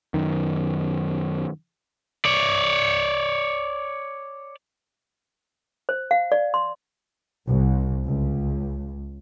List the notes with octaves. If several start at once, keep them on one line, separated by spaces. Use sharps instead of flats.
F#2 D#3
C#5 D5
C5
F5
D5
C6
C2
C#2